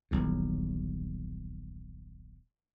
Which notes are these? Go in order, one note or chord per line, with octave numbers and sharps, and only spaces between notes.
D#1 B1 E2